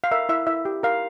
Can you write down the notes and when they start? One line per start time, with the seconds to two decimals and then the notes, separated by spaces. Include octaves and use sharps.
0.04 F5
0.11 A#4 E5
0.29 E4 E5
0.47 E4 E5
0.65 G4
0.83 A#4 F5